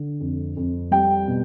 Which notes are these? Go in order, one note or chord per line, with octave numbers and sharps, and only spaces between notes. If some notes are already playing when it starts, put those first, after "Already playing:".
Already playing: D3
F2
F2
G3 G5
B2